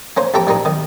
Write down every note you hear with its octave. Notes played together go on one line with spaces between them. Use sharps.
A#3 C#4 C5
F2 G4 A4 E5 A#5 D6
A#1 G3 A#3 D#4
B1 D#3